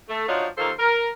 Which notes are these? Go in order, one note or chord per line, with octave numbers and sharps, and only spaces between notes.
A3
F3 D4 D#4 F4 F#4 C#5
D#2 D#3 A#3 F4 A4 C5
A#4